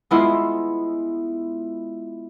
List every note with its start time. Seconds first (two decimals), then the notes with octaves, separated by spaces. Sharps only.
0.11 G#3 B3 E4 F4